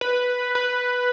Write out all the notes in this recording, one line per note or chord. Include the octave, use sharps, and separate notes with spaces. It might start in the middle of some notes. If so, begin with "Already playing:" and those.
B4
B4